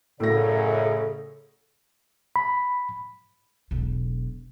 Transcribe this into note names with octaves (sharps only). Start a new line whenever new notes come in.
F#2 A2 C#3 A4 D5 A#6
B5
E1 B1